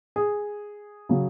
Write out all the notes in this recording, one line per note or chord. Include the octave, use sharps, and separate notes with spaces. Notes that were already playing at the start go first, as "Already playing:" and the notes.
G#4
C#3 F#3